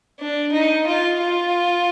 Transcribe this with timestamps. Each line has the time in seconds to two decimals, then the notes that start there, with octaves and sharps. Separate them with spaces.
0.20 D4
0.53 D#4
0.86 F4
1.20 F4